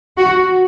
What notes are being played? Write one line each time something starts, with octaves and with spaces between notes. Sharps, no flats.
F#4